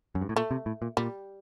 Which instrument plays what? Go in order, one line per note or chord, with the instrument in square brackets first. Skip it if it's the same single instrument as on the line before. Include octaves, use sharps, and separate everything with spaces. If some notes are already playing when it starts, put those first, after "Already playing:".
[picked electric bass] F#2
G2
A2
[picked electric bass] A#2 [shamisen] A3
[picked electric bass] C3
A2
A#2
[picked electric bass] A#2 [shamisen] G3